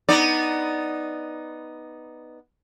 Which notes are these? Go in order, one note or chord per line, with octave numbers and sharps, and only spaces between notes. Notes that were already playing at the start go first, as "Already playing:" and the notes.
B3 D#4 D5